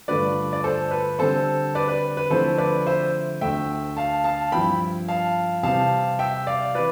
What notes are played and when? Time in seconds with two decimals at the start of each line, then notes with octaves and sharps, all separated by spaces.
0.08 G2 D3 A3 D4 F4 B4 D5
0.53 D5
0.64 A4 C5
0.91 B4
1.19 D3 G3 C4 A4 C5
1.75 B4 D5
1.88 B4
2.17 B4
2.30 D3 F3 A3 C4 E4 A4 C5
2.58 B4 D5
2.87 C5 E5
3.41 D2 D3 A3 E5 G5
3.97 F5 A5
4.24 F5 A5
4.52 G2 F3 C4 E4 G5 B5
5.08 F5 A5
5.63 C3 E3 G3 C4 F5 A5
6.19 E5 G5
6.47 D5 F5
6.75 E3 B4 D5